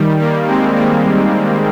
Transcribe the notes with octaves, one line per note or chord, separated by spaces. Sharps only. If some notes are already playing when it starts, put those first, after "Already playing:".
Already playing: D#3 G3
G3 A#3
G#3 C4
G3 A#3